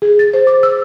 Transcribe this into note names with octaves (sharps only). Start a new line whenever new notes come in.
G#4
A6
C5
D6
E6